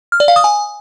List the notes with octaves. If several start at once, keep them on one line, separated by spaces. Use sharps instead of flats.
F6
D5
F5
D#6
G#5